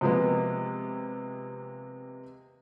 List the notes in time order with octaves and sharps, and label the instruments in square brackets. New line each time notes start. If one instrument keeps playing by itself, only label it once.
[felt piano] C3 F3 G#3 A#3 B3